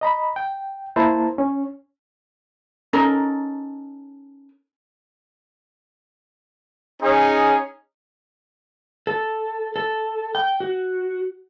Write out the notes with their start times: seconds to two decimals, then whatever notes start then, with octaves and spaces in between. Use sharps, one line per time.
0.01 D#5 A#5 B5
0.36 G5
0.96 A#3 E4 C5 A5 A#5
1.38 C#4
2.93 C#4 D#4 A4 A#4
7.02 C#4 D#4 G#4
9.07 A4
9.76 A4
10.35 G5
10.60 F#4